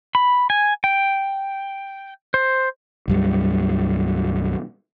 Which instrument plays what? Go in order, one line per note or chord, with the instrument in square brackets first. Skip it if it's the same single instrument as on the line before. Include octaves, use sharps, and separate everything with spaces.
[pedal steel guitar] B5
G#5
G5
C5
[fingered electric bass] B1 F#2 G3